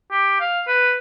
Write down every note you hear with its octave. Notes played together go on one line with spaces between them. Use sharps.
G4
F5
B4